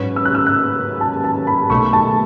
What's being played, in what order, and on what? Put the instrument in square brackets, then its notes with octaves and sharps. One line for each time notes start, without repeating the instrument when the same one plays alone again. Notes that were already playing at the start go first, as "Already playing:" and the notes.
Already playing: [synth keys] G#2 F#3 C#4 G#4 B4
[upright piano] E6
F#6
E6
F#6
A5
A5
B5
[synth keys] B1 B2 A3 [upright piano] C#6
[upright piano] A5